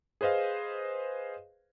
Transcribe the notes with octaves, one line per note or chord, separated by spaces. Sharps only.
G#4 B4 C5 D#5 F5